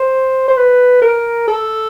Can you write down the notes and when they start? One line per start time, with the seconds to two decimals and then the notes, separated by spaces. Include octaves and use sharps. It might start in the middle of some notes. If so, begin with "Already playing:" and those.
Already playing: C5
0.48 C5
0.57 B4
1.02 A#4
1.48 A4